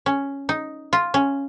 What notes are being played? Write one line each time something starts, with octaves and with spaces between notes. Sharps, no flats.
C#4
D#4
F4
C#4